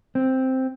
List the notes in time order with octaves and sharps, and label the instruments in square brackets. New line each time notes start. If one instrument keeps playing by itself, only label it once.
[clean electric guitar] C4